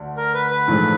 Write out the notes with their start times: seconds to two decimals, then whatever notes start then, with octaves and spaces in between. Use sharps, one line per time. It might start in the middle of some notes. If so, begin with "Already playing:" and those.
Already playing: D2 D3
0.17 A#4
0.34 B4
0.51 B4
0.67 A#1 G#2 E3 A3